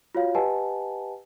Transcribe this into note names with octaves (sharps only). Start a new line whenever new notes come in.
F4 F#4 C#5 F5
G4 B4 D#5 F#5 G#5 A5